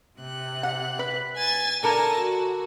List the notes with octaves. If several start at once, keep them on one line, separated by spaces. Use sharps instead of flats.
C3 F#6
F#5
B4
G#5 A6
D3 A4 A#4 G#5 A5 A#6
F#4